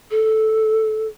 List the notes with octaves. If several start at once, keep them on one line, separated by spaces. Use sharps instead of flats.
A4